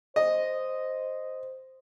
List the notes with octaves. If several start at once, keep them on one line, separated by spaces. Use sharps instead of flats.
C5 D#5